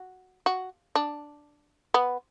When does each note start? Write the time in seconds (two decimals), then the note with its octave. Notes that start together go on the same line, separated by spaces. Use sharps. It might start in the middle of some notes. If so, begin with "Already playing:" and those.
Already playing: F#4
0.46 F#4
0.95 D4
1.94 B3